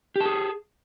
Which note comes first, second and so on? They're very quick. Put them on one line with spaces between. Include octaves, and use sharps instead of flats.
G4 A5 G#4